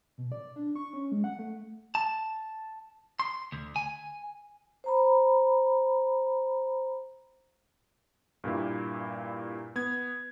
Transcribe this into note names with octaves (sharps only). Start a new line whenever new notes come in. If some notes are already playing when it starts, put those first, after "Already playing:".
B2
D5
D4
C#6
C#4
G#3
F#5
A3
A5
C6
D2
G#5
C5 A#5 B5
G2 A#2 A#3 E4
B3 G#6